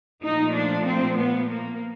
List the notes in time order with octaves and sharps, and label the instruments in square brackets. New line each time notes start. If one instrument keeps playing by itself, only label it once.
[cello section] A#2 F3 A3 D#4
D4
C4
B3
A#3